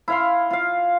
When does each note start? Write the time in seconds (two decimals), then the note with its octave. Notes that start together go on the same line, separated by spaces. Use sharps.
0.08 E4 F5 C6
0.51 F4 F5